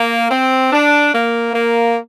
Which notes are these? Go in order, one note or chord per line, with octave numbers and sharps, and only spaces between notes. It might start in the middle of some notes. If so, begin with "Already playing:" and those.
Already playing: A#3
C4
D4
A#3
A#3